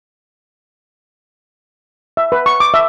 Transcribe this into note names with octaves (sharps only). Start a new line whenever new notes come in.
E5
B4
C#6
D6
E5